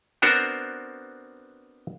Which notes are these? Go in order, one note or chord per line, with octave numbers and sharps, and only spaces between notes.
B3 C4 D4 F#4 A#4 C5